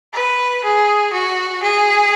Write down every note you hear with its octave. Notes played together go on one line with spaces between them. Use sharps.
B4
G#4
F#4
G#4